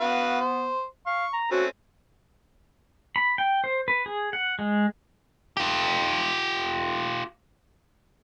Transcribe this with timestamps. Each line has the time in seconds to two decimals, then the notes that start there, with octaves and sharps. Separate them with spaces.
0.01 B3 F#4 B4 F5
0.41 C5
1.06 F5 C#6
1.33 A#5
1.52 A3 C4 C#4 F#4
3.16 B5
3.38 G5
3.64 C5
3.88 B4
4.06 G#4
4.33 F#5
4.59 G#3
5.57 F4 G4